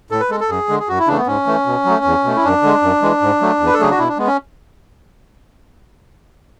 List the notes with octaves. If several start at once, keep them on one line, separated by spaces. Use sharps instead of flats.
A2 A4
B4
G#3 A4
A4
F#2 G#4
D3 G#3
G#4
F#2 F#4
E4
C#3 E3 A3 D4
B3
G#2 C#4
E3 A3
B2
F#3 A3
E2
B2 A3
E4
F#2 D4
D3 G#3
F#2
E3 G#3
G#2
F#3 A3
E2
B4
A4
C#3 F#3 A3 G#4
F#4
B2 E4
D4
G#3 B3
C#4